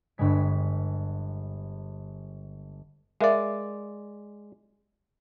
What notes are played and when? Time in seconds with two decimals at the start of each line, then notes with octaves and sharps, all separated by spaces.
0.18 G1 G2 G3 G#3 B6
3.21 G#3 A#4 D5 E5 F5